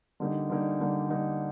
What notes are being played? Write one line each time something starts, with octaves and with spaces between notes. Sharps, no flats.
D3 G3 A#3 D#4
D3 G3 A#3 D#4
D3 G3 A#3 D#4
D3 G3 A#3 D#4